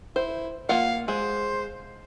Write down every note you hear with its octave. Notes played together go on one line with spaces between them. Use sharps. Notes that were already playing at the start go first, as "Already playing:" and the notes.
E4 C5
A#3 F4 F5 F#5
G#3 G#4 C5